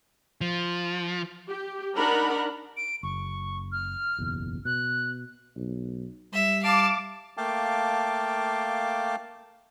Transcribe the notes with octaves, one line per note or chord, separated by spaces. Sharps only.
F3
G4
D4 D#4 A#4 F#5 A#5 B5
D7
F#1 C#6
F6
F#1 B1 E2
B2 F#6
B1
G3 E5
F5 A5 D6
A3 A#3 F5 G5 A5 D6